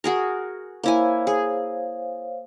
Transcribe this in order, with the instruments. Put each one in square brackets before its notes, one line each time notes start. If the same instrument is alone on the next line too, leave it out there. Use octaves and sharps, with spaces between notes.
[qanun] F#4 G#4 A#4
[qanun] A#3 E4 G#5 [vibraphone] C5 C#5 F5
[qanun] G#4